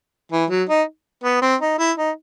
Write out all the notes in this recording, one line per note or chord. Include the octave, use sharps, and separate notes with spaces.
E3
F#3
D#4
B3
C4
D#4
E4
D#4